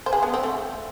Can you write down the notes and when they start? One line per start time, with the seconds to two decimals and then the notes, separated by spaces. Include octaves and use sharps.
0.06 C5
0.13 G#4 B4
0.23 B3 D4
0.34 C4
0.43 A3